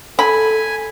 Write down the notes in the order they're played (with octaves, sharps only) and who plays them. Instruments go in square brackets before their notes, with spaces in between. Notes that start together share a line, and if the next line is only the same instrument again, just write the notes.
[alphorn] A4 [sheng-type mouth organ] G#5 [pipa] B5